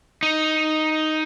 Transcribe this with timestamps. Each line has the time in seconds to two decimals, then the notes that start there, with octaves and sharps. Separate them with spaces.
0.23 D#4